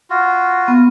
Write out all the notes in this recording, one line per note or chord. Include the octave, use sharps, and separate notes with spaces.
F4 F#4
B3